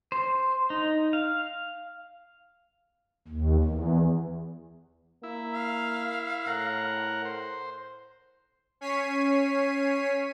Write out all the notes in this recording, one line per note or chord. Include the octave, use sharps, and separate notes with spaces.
C5
D#4
F5
D#2
E2
A#3 E4
F5
A2 A#4 F#5
C5
C#4 C#5 B6 C7 D#7